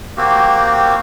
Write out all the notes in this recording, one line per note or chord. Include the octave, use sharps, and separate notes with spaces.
A#3 C4 F#4 G4